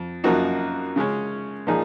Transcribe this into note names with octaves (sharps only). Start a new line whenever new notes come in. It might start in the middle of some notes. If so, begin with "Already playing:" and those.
Already playing: F2
F#2 F3 A#3 D#4 F#4
C#3 G#3 C#4
A#2 F3 A#3 D#4 G#4